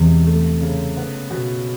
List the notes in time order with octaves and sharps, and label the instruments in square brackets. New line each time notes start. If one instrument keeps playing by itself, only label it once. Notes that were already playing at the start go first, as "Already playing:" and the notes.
Already playing: [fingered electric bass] E2 [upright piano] C3 G#3
[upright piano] A3
C#3
B3
B2